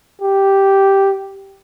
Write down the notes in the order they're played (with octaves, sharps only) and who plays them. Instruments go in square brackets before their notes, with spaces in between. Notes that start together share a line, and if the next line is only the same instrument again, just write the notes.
[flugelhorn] G4